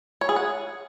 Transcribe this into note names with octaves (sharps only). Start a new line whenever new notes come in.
C#5
G#4
F#5